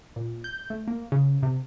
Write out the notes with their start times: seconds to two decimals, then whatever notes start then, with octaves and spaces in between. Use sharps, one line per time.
0.16 A#2
0.44 G6
0.70 A3
0.88 A#3
1.12 C#3
1.43 C3